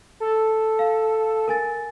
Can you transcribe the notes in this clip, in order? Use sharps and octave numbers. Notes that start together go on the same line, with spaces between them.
A4
F5
A#4 G#5 A6